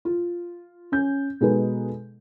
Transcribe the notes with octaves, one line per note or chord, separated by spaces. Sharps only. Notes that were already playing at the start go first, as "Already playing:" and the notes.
F4
C#4 G6
B2 G#3 D#4 G#4 A4 B4